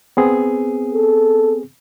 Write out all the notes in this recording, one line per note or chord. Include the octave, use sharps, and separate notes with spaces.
B3 C4 G#4
A4